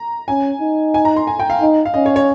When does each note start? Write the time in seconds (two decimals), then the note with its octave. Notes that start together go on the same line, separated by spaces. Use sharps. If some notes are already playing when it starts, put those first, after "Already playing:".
Already playing: A#5
0.28 C#4 G#5
0.61 D#4
0.94 G#5
1.05 A#5
1.16 C6
1.27 G#5
1.39 G5
1.50 F5
1.61 D#4
1.85 F5
1.94 C#4 D#5
2.06 C#5
2.16 C#5